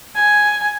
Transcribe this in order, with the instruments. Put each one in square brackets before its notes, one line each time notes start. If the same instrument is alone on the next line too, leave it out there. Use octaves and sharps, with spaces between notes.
[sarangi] G#5